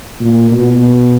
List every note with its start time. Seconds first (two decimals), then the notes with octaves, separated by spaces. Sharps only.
0.20 A#2
0.51 B2